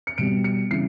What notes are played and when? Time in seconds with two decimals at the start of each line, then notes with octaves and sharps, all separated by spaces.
0.07 C#7
0.18 B2 G3 D7
0.44 C#7
0.71 C#3 E3 G3 C7